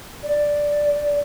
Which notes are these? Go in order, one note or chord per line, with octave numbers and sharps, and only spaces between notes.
D5